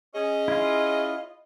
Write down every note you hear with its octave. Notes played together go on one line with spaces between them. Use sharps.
C#4 G#4 D#5
E4 F4